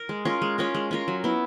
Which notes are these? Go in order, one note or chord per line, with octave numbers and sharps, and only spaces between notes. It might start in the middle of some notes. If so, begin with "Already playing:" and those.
Already playing: A#4
G#3
C#4 F4 A#4
G#3
C#4 F4 A#4
G#3
C#4 F4 A#4
F#3
B3 E4